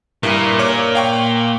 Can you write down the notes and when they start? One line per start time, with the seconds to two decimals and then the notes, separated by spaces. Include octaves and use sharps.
0.23 G2 A#2 A#3 E4
0.59 A#4 C#5 D6
0.95 F5 G5 C#6